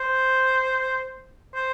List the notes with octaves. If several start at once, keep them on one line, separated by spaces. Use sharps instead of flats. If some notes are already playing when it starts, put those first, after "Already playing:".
Already playing: C5
C5